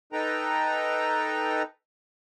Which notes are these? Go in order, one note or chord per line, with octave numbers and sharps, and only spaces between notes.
D#4 A4 B4 G5 A#5